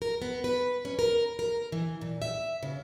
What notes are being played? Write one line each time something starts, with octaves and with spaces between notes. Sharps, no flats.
A#4
B3
B4
C#4
A#4
A#4
E3
A#2
E5
C#3